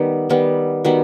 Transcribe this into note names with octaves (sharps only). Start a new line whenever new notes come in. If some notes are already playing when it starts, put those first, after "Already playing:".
Already playing: D#3 G3 B3
D#3 G3 B3
D#3 G3 B3 F#4